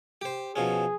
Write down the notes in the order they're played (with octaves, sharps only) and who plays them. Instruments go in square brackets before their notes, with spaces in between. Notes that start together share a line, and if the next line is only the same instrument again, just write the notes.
[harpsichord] G4 C5
[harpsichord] B2 F3 C#4 [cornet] G#4